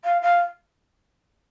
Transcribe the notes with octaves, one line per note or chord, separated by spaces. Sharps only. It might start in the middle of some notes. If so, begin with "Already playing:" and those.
F5
F5